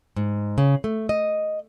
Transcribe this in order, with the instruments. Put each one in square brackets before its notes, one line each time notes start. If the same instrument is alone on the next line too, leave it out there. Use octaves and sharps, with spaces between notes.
[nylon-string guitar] G#2
C#3
A3
D#5